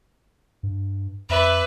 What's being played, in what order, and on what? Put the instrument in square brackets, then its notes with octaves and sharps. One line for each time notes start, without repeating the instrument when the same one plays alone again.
[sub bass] G2
[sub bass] F2 [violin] B4 [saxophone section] D5 E5